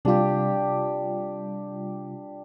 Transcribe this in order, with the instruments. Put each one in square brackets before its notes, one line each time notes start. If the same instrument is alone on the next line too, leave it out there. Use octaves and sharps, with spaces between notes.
[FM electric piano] C3 G3 F4 [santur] D4 G4